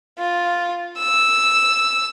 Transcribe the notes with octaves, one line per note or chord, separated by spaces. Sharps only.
F4
E6